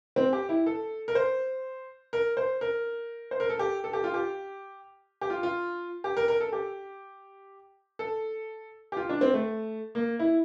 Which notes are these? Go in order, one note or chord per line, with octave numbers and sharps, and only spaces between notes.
C4
G4
E4
A4
A#4
C5
A#4
C5
A#4
C5
A#4
A4
G4
A4
G4
F4
G4
G4
F4
F4
G4
A#4
A#4
A4
G4
A4
G4
F4
D4
C4
A3
A#3
E4